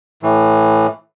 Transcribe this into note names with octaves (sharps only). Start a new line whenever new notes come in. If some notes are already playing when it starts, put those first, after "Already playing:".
A2 E3